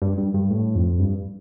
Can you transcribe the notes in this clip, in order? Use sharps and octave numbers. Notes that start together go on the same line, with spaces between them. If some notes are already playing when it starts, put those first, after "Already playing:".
G2
G2
G2
A2
F2
G2